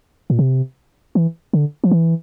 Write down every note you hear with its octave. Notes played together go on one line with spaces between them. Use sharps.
A#2
C3
E3
D3
F3
E3